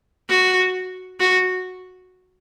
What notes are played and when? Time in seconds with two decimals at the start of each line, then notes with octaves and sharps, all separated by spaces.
0.29 F#4
1.20 F#4